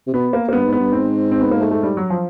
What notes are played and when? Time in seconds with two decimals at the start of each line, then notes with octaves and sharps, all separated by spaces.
0.07 C3
0.14 B2 B3
0.33 A#3
0.49 A#3
0.53 G2 B3
0.66 G#2
0.73 B3
0.79 G2
0.92 G#2 C4
1.31 C4
1.41 B3
1.51 A#3
1.61 A3
1.71 A3
1.83 G3
1.97 F#3
2.10 F3